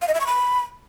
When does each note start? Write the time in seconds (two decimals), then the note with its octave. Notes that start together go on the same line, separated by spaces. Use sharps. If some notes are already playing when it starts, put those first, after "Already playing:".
0.02 F5
0.08 D#5
0.14 E5
0.20 C#6
0.26 B5